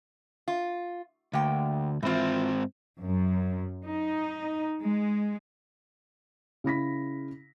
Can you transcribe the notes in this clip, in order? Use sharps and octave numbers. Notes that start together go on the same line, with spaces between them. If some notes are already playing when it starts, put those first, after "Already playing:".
F4
D2 A#3 G5
G#2 E3 C4 F4
F#2
D#4
G#3
C#3 E4 A#6 B6